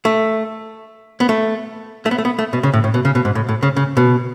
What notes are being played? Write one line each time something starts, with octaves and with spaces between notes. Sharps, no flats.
A3
B3
A3
A3
B3
A3
B3
A3
B2
C#3
A2
A2
B2
C#3
B2
G#2
A2
A2
C#3
C#3
B2